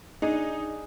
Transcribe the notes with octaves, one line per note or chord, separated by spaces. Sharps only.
D4 D#4 G#4